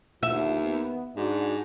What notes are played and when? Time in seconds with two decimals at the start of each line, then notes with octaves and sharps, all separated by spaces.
0.23 D#2 D3 F3 F4 E5
0.62 B3
1.17 G#2 D4 F#4